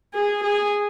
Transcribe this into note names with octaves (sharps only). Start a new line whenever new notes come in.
G#4
G#4